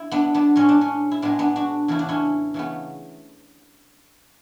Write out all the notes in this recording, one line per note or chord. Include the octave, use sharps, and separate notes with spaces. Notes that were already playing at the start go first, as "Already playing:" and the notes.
Already playing: E4
B3 D4
B3 D4
A2 G#3 C#4
D4
C#4
E4
A2 G#3 B3 D4
B3 D4
D4 F#4
E2 C#3 E3 A3 E4
D4
C#4 E4
C#3 E3 A3 B3